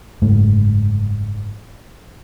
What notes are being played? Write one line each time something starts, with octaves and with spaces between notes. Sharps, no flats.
F#1 G#2 A3